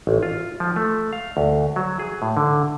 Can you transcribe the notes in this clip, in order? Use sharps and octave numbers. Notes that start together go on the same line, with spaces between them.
A1
F4
F3
A3
F5
D2
F#3
G#4
A2
D3